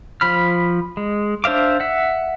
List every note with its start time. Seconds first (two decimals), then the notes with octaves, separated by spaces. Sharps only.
0.21 F3 B5 F6
0.97 G#3
1.44 D4 C5 E5 F5 D6
1.80 E5 F#5